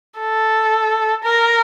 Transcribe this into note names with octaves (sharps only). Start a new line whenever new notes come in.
A4
A#4